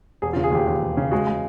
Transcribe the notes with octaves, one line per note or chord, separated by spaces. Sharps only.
E1 G#4
F4
C#3
G#4
D#2 G4
D#2
E1
C#3
G#3 F#4
G#3